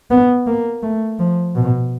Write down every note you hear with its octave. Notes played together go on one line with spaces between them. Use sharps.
B3
A#3
A3
F3
B2